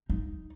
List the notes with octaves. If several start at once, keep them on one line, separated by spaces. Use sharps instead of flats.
D#4